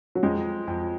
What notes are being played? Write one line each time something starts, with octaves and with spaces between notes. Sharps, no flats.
F#3
F2 G#3
F2